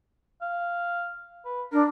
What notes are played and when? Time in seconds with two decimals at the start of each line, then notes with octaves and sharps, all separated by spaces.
0.42 F5
1.45 B4
1.72 D4 A#4